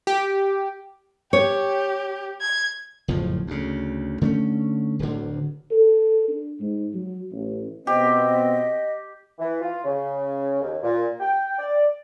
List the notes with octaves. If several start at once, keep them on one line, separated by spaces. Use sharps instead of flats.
G4
G4 C#5
G#6
F#1 F2 A2 F3
D2 C#3
D3 A3 C4 C#4
D1 D2 D3
A4
D4
G#2
F#3
A1
B2 B3 C4 G4 D#5
E3
F4
C#3
D#2
A#2
G5
D5